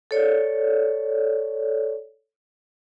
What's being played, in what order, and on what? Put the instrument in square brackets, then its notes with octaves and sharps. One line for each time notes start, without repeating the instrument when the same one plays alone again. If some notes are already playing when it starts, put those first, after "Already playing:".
[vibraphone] A4 C#5 D5